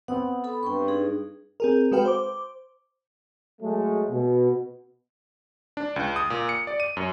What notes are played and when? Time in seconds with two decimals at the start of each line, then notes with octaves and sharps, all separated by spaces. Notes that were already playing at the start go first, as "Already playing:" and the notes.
0.08 B3 C4 F#5 D#6
0.44 A4 B5
0.63 G2 G5 C6 C#6
0.88 D#4 G#4
1.60 C4 G#4 A#4
1.92 G#3 F#4 A4 B4 F5 G5
2.05 C5 D6
3.62 F#3 G#3 A3
4.10 B2
5.77 D4
5.96 C#2
6.16 D#6
6.30 A#2
6.49 C#7
6.67 D5
6.80 D#7
6.97 F#2